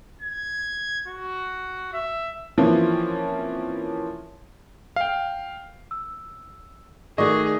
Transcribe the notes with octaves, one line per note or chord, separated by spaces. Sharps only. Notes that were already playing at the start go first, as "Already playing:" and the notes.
G#6
F#4
E5
E3 F3 A#3 C4 C#4
F5 G5
E6
D#3 A3 F#4 G#4 D5 D#5 C#6 D6